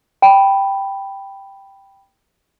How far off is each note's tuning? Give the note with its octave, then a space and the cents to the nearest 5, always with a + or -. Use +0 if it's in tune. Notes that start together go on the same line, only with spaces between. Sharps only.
G5 +0 B5 +0